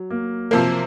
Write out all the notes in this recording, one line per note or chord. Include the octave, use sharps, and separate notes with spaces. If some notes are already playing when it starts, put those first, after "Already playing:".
Already playing: F#3
A#3
C3 F3 A#3 C4